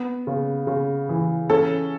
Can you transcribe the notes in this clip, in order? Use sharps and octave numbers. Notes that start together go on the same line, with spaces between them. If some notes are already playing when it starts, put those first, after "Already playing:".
Already playing: B3
C#3
C#3
E3
C#4 A4